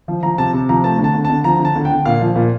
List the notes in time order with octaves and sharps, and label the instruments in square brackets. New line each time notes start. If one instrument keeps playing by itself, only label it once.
[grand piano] F3
F3 A#5
C3 A5
C3
F3 A#5
A3 A5
D3
A5
D3
A5
D3
F3 A#5
D3
A5
D3
G5
D3
A#2 F5
F3
A#2